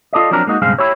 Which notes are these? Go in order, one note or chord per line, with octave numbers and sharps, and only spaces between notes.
F4 A4 D5 D#5
F3 F#3 C4 D4 A#4
G#3 A#3 D#4 F#4
B1 G2 C#3 G#3 C4 F5
E4 G4 C#5